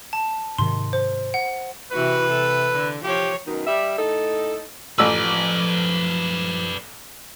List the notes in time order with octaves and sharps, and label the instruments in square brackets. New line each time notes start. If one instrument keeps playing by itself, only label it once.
[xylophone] A5
[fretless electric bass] G#2 C3 D#3 [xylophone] C6
[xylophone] C5
F#5
[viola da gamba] C3 E3 F#4 [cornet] B4
[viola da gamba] C3 A4
D3
[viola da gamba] F3 F4 C#5 [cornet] G4
[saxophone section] F#2 B2 D#3 D#4
G3 E5
A2 D#4 A4
[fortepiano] A1 E6 [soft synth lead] F3 [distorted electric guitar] B4 D5